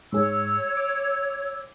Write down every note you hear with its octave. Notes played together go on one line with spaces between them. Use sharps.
G#2 G#4 C#5 E6
D6